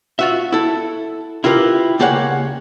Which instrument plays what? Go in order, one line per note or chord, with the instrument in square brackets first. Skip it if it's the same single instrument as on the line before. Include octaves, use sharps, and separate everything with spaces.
[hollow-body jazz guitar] F4 F#4 E5
E4 A4
E4 F4 G4 A#4 B4
C#2 A#3 G4 G#4 C#5 F#5